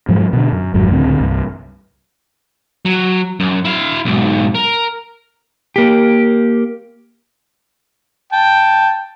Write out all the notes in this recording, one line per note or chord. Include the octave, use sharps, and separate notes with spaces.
G#2 F3 F#3
B2 D3
F#2
G#1 F2 G#2 F#3
C#2 A2 D3 C4
C2 G2
F#3
F#2
E4 F5
B1 G#2
A#4
A#3 G4
G5 A5